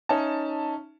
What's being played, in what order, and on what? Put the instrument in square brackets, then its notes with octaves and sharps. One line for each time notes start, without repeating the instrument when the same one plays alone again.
[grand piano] C#4 D#4 E5 A5